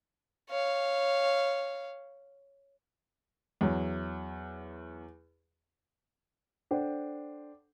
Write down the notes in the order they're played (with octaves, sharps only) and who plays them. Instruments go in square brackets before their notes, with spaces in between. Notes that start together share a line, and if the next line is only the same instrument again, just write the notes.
[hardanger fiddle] C#5 F5
[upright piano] E2 F#3
[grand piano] D4 A4 C5 F#5 G5